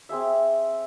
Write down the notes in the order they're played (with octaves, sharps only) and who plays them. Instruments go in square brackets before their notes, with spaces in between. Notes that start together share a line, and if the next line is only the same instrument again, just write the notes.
[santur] C4 G4 G#4 E5